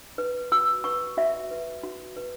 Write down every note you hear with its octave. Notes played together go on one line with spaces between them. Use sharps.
B4
F#4 E6
B4 C#6
F#4 E5
B4
F#4
B4